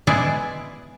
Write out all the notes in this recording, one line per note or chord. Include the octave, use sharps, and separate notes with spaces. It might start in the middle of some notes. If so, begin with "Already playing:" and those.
G#3 B3 E4 G#4 D5